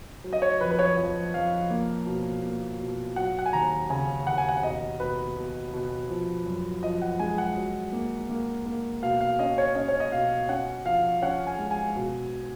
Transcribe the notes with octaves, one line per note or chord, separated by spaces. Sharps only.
F#3
D#5
C#5
F2 B4
B4
C#5
F2 C#5
F2 F5
A#3
B2
A#3
B2
F#3 F#5
F#5
G#5
D#2 A#5
C#3 G#5
D#2 F#5
G#5
F#5
B2 D#5
B2 B4
B2
B2
F3
F#2
F3 D#5
F#5
G#3 G#5
F#5
F#3
A#3
A#3
A#3
B2 F5
F5
C#4 D#5
C#5
C#4 D#5
C#5
D#5
B2 F5
C#4 F#5
F3 F5
C#4 F#5
G#5
G#3
G#5
B2